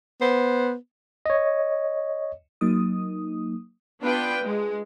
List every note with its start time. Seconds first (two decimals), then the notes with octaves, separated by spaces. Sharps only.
0.21 B3 C5
1.26 C#5 D#5
2.61 F#3 A#3 D#4 D#6
4.01 B3 D4 F4 B4 G5
4.43 G#3